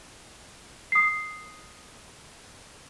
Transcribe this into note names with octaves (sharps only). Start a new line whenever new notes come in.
D#6 C7